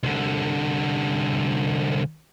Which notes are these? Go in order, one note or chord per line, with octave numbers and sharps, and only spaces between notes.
C2 D3